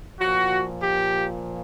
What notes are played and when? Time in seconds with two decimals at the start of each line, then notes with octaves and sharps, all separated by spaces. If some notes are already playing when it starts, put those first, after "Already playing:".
0.20 A#2 F3 F#4
0.82 G4